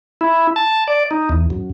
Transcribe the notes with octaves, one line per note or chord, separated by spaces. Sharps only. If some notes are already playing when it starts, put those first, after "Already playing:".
E4
A5
D5
D#4
E2
F#2